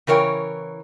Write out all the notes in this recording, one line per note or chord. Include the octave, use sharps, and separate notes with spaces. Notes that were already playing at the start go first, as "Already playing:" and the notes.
C#3 E3 A#4 C#5 G5